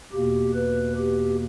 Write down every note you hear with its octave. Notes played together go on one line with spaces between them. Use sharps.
E2 B2 A#3 G4
B4
G4